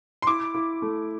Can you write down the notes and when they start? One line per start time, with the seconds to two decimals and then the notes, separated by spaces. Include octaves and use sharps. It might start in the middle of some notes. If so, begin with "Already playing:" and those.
0.22 C6
0.27 E4 D6
0.54 E4
0.82 A3